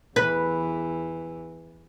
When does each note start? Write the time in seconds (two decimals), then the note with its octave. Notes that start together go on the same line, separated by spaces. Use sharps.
0.16 E2 E3 B4